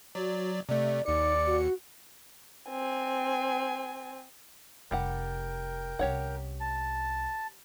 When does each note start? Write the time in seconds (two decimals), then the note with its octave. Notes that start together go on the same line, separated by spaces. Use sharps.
0.15 F#3 F#4 D5
0.69 C3 A3 D5
1.06 D#2 D#4 D5 C#7
1.46 F#4
2.70 C4 G#5
4.91 F1 G3 G4 A#4 F#5 G5
5.99 C2 C#4 G4 C#5 F#5
6.60 A5